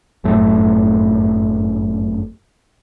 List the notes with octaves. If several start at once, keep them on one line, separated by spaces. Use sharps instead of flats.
G1 F#2 A2 A3